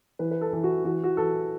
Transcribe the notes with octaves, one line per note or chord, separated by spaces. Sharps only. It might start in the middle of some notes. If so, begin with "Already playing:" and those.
E3 B4
B4
A4
E3
F#4
E3 F#4
F#4
E3 A4